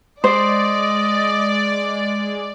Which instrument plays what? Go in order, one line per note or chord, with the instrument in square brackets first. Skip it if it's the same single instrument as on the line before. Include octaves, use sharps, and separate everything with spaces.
[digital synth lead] G#3 [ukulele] C5 [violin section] D5 [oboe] D#5